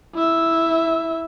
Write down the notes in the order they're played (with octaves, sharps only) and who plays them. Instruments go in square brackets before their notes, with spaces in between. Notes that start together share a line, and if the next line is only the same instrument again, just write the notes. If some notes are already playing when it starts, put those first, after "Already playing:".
[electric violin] E4 E5